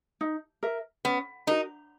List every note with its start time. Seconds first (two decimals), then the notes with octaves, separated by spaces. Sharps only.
0.21 D#4
0.63 A#4 E5
1.05 B3 C#4
1.47 D#4 F#4 A#4